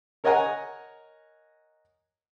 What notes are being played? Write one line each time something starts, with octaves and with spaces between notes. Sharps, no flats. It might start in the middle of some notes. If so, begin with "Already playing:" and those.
A#4 C#5 D#5 F#5 G#5 A#5